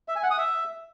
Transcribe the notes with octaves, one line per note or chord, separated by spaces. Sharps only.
E5
G#5
F#5
D#6
E5